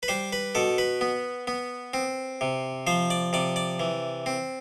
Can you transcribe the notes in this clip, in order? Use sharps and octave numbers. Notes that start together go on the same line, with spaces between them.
B4
G3 C5
B4
B2 A4
B4
B3
B3
C4
C3
F3 C5
D5
C3 D5
D5
E3
C4